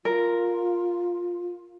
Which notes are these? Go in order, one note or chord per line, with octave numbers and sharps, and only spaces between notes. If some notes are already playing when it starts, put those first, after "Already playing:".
F4 A#4